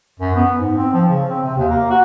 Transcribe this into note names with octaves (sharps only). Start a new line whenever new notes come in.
F#2
B3
G#2
C4
F3
C#3
C4
C3
D#2
A#3
F#4